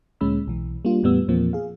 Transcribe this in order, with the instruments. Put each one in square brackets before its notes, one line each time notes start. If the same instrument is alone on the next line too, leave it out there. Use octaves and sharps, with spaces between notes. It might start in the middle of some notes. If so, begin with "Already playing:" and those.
[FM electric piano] D2 A#2 G#3 C#4 B5 E6
B1 E3
G3 A#3 D4 F4
E2 A2 G3 B3 E6
E2 A#2 F3 A#3 C4
G#4 F5